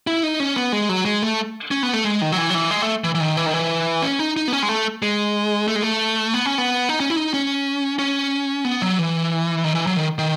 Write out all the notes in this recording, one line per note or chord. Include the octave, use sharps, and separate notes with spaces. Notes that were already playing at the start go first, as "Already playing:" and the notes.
E4
D#4
C#4
B3
G#3
F#3
G#3
A3
C#4
B3
A3
G#3
D#3
F#3
E3
F#3
E3
G#3
A3
E3
E3
D#3
E3
D#3
E3
C#4
D#4
D#4
B3
C#4
G#3
A3
G#3
A3
G#3
A3
B3
C#4
B3
D#4
C#4
E4
D#4
C#4
C#4
B3
F#3
E3
D#3
E3
F#3
D#3
D#3